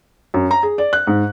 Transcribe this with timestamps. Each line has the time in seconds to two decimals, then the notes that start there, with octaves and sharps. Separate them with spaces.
0.34 F#2
0.51 A#5
0.63 G#4
0.78 D5
0.93 F#6
1.07 G#2